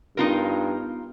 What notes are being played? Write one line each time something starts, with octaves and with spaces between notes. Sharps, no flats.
G2 B3 D#4 F4 A#4